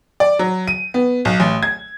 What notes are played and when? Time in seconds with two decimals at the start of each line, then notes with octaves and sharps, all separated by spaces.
0.20 D5
0.39 F#3
0.68 D#7
0.94 B3
1.25 B1
1.40 A1
1.63 G#6